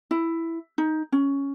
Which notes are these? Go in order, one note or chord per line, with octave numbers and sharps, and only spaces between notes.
E4
D#4
C#4